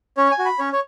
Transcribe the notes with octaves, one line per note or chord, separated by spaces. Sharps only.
C#4 C#5
G#5
F#4
B5
C#4 C#5
C#5